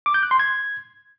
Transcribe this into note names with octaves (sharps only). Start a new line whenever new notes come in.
D6
G6
F#6
C6
G#6